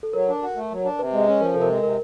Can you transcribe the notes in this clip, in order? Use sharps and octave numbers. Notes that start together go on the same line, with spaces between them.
A4
F#3 A#4
D4
F#4
A3
F#3
D4
C3 B4
G#3
C#4
F3 A#4
C3 A4
A#4
G#3
C3 A#4